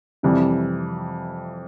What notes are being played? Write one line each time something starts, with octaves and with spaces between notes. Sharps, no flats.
F2 C3 E3 G3